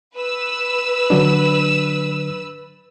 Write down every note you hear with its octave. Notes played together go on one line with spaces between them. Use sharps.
B4 E6
D3 F#3 D4